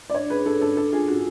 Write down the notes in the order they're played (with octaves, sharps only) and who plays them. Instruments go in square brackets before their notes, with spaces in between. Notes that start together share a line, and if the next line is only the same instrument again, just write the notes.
[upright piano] D5
[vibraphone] D4 [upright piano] C#5
[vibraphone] G#4 [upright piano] B4
[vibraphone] D4 [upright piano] A4
[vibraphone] D4 [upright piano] A4
[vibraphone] D4 [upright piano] A4
[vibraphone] F4 [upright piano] G#4
[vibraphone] F4 [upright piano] F#4